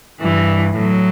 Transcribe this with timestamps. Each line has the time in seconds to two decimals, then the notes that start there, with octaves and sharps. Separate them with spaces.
0.21 G2 E3
0.77 A2 F#3